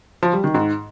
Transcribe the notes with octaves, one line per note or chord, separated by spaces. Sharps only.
F3
G3
D#3
G#2